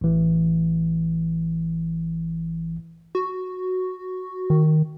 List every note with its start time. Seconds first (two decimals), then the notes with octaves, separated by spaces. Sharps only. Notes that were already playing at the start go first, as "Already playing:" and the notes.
0.01 A1 E3
3.15 F#4
4.50 D#3